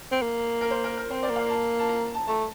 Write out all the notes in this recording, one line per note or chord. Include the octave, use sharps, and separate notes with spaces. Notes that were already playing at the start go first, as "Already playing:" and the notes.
C4
A#3
A#4
C5
A#4
A#4
C4 C5
D5
A#3
F5
A5
A5
A#5
A5
A3 A5